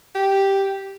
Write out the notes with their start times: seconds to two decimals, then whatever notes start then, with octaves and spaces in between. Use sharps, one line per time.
0.15 G4